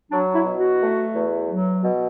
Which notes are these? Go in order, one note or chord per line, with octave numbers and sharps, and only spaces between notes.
F#3 D4
E4
B2
F#4
A3
E2
F#3
B2